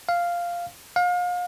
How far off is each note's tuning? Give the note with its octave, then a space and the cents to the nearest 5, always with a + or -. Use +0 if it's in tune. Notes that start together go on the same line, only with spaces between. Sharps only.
F5 -5
F5 +35